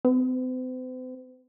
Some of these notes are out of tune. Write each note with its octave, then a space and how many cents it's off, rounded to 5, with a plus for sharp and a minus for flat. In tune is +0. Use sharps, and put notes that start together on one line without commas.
C4 -45